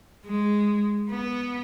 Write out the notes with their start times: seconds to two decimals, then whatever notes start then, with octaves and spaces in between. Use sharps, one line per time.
0.26 G#3
1.11 B3